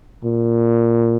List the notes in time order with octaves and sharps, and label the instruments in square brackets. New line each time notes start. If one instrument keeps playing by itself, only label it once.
[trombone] A#2